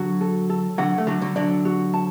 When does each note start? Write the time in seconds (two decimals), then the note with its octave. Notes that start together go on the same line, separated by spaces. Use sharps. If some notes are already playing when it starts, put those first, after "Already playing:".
Already playing: D3 F#3 F#4
0.21 A4
0.50 A4
0.78 D3 F#3 F#5
0.98 A3
1.07 D3 F#3 D4
1.22 D3 F#3
1.36 D3 F#3 D5
1.65 F#4
1.93 A5